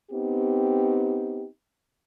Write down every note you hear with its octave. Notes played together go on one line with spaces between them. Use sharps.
B3 C4 D#4 G4